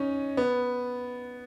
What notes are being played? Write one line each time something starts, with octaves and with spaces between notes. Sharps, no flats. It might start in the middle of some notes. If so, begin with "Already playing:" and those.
Already playing: C#4 D#4
B3